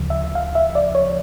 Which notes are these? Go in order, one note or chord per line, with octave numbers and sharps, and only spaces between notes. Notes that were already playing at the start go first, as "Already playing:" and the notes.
Already playing: D2 C#3 F3
E5
F5
E5
D5
C#5